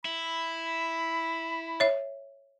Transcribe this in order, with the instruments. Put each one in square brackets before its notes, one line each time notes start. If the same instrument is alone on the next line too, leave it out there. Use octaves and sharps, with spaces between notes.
[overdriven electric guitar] E4 [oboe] B5
[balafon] C#5 E5